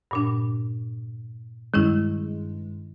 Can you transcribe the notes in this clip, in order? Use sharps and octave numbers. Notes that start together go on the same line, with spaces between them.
G2 A#2 D4
G2 D#3 G#3 C#4 E4